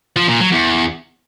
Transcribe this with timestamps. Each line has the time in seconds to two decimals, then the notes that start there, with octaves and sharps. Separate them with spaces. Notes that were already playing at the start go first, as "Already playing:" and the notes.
0.17 F3
0.29 A#2
0.40 F#3
0.52 E2